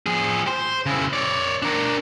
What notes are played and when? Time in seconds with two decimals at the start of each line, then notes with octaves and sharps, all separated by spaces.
0.06 F3 G#4
0.47 C5
0.86 C#3 E4
1.13 C#5 D5
1.62 D4 A#4